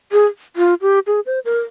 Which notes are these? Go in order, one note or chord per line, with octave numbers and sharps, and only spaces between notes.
G#4
F4
G4
G#4
C5
A#4